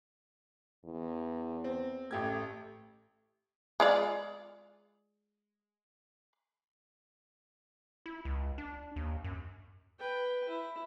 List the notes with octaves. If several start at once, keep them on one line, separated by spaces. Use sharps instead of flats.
E2
C4
A1 A3 G4 G#6
G#3 F4 D5
E4
C#2
D4
D#2
F#2
B4 G5
E4